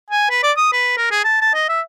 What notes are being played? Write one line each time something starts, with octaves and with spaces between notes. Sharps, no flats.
G#5
B4
D5
D#6
B4
A#4
G#4
A5
A5
D#5
E5